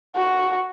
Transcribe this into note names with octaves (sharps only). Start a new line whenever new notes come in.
F#4